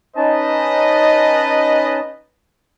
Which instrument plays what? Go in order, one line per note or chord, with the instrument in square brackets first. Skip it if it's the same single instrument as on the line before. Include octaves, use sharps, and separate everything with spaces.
[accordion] C#4 D#4 A5 [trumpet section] B4 D#5